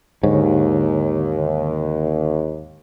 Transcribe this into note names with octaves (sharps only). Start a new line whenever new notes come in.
D#2 G#2 D3 C#5